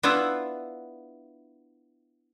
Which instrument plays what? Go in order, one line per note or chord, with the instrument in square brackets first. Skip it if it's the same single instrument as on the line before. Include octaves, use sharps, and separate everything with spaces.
[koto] B3 D4 E4 F4 E5 F#5